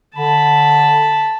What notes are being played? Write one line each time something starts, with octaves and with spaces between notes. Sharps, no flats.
D3 A5 B5